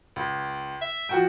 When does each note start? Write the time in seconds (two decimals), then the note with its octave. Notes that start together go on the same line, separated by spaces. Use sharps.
0.16 C#2
0.82 E5
1.09 F3 F#4 G5